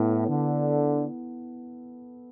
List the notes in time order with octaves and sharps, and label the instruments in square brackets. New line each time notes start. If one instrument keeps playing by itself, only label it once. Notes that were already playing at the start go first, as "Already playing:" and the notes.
Already playing: [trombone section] A2 [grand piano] B3 E4 A4
[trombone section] D3